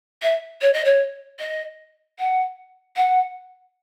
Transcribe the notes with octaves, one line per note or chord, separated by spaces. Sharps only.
E5
C#5
D#5
C#5
D#5
F#5
F#5